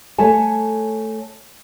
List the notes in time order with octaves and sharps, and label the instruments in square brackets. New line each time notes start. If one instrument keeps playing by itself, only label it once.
[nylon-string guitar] A3 C#5 G#5 A5